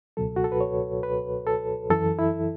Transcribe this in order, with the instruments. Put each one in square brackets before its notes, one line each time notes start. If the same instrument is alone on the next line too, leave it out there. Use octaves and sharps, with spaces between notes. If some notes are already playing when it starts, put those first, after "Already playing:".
[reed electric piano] C#2 B2 F#3 A4
F#4
A4
B4
C#5
B4
A4
F#2 E3 A4
E4